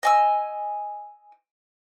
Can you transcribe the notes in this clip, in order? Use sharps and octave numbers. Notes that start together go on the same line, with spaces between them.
D#5 G#5 E6